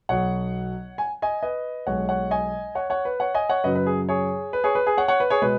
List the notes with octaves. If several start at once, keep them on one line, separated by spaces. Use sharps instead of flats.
B1 B2 F#3 C#5 F#5
G#5
D#5 G#5
B4 D#5
B1 B2 G#3 C#5 F#5
C#5 F#5
D#5 G#5
C#5 F#5
C#5 F#5
B4
C#5 F#5
D#5 G#5
C#5 F#5
F#2 C#3 F#3 B4 D#5
B4
G#4
G#4 C#5
B4
G#4 C#5
B4
G#4
C#5 F#5
C#5 F#5
B4
G#4 C#5
B2 G#3 B4